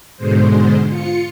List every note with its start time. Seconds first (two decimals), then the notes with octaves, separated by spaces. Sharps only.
0.16 G#2 B2 D3 G#3 C5
0.89 F4 C#7